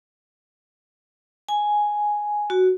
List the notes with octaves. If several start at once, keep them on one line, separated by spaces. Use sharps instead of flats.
G#5
F#4